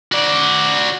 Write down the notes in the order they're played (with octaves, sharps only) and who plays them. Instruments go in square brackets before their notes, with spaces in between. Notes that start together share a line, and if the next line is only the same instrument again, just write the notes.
[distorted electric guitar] F#4 D5